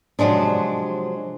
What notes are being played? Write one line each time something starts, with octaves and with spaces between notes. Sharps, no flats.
C3 F3 F#3 G#3 D4